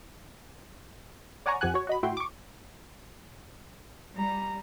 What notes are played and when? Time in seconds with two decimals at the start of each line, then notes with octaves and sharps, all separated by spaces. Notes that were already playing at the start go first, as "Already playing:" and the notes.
1.46 C#5 D5 F#5 G#5 A#5 C#6
1.61 F2 F3 G4 F#5 G#5 F#6
1.74 F#4 C#5
1.87 F#4 D#5 B5
2.03 A2 E4 F#4 G5 C6
2.17 C#6 D6
4.17 G3 A#5